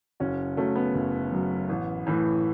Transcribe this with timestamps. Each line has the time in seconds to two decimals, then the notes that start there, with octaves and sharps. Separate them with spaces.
0.20 F#1 C#4 F#4
0.57 F#2 F#3 A3 C#4
0.76 B3
0.94 F#1
1.32 F#2 F#3
1.69 A1
2.07 A2 E3